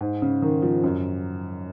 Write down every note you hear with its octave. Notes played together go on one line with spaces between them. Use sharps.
G#2
C#3
D#3
F3
F#2